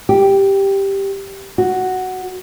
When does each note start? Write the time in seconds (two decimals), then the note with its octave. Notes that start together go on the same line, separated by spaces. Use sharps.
0.09 G4
1.58 F#4